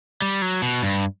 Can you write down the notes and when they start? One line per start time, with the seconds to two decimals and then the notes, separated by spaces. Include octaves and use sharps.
0.22 G3
0.42 F#3
0.62 B2
0.83 G2